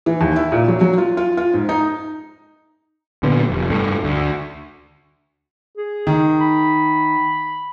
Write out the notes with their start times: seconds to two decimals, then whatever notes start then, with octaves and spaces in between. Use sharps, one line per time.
0.06 E3
0.21 D#2
0.36 E4
0.52 A#2
0.68 F#3
0.81 F#3
0.98 F4
1.17 F4
1.37 F4
1.54 G#2
1.69 D#4
3.23 A#2 D3 F#3 B3
3.50 F1
3.70 G2 A3
4.04 D2
5.77 G#4
6.07 D#3
6.40 B5